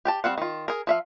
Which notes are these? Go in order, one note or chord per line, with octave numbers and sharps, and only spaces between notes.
G4 G5 A5
G3 C4 F5 F#5
D#3 F4
G#4 A#4
F3 E5 F5